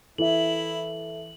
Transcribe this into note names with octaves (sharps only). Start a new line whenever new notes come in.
E3 E4 A4 E5 F#7